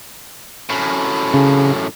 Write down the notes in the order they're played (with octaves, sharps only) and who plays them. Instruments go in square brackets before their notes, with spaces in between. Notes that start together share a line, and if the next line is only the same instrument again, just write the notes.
[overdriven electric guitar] F#2 A2
[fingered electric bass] C#3